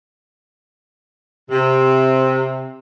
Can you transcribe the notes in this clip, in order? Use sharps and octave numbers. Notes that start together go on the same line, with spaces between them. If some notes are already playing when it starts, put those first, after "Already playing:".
C3